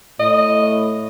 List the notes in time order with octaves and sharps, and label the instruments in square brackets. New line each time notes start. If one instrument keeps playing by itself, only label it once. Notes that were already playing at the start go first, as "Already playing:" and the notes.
[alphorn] A2 [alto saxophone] D#5